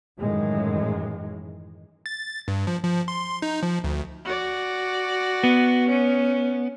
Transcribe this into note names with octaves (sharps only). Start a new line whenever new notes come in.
F#2 A2 D#3 E3 G#3
A6
G2
F3
F3
C6
D#4
F3
D2
F#4 D5
B3
C#4